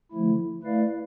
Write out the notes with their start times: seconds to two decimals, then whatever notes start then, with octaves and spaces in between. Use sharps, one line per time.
0.11 D3 F3 A3 E4
0.63 A3 E4 B4 D5 F5